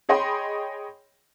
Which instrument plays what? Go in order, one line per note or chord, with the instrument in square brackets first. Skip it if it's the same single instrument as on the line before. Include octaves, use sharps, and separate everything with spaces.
[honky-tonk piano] G#4 C#5 D#5 G5 B5 C6